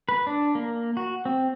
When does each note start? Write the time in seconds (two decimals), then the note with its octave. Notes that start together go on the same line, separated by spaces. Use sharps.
0.09 B4
0.27 D4
0.55 A#3
0.97 F#4
1.25 C4